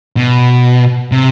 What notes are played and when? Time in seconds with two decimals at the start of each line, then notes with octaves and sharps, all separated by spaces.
0.17 B2
1.12 C3